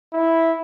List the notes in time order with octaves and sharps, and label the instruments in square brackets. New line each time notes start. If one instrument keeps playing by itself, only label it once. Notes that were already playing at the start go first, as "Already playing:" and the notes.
[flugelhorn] E4